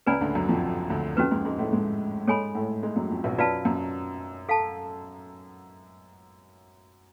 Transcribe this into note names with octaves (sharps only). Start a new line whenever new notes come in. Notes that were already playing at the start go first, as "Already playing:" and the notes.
C#2 C#3 B4 D5 G#5 B5
D2 D3
F#2 F#3
F2 F3
D2 D3
F2 F3 C#4 F#4 B4
G#2 G#3
G#2 G#3
A2 A3
G#2 G#3
G#2 G#3 A4 C#5 G#5 B5
A2 A3
G#2 G#3
F#2 F#3
F2 F3
B1 B2
F#2 F#3 F4 B4 D5 F5 A5
F#2 F#3
A4 F5 A5